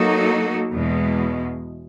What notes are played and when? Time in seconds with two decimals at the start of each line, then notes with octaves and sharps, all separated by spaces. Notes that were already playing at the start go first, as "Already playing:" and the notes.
Already playing: F#3 A#3 D#4 F#4 A4
0.71 E2 B2 G#3